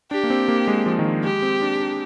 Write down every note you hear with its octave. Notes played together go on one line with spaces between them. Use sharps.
D4 G4
A#3
C4
A#3
G#3
F3
D#3
F3
G#3 G4
C4
D4
D4